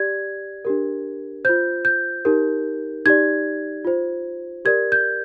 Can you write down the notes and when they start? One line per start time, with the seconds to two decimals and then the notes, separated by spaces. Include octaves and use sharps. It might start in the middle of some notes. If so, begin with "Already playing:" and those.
Already playing: G4 D5 G#6
0.65 D4 G4 A#4
1.45 F4 C5 G6
1.85 G6
2.25 D#4 G4 A#4
3.05 D#4 G4 D5 G#6
3.85 F4 C5
4.65 G4 A#4 D5 G#6
4.92 G6